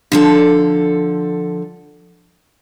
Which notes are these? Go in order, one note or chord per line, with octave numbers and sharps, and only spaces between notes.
D3 F3 A4